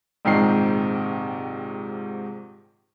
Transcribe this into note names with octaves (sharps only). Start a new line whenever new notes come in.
A#1 G#2 C3 D#3 C7